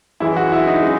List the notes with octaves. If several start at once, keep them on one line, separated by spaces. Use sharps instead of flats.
F#2 E3 G#3 E4
F#4
E4
D#4
C#3 G#3